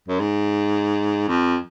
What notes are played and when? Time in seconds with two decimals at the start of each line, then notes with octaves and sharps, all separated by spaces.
0.08 F#2
0.20 G#2
1.28 F2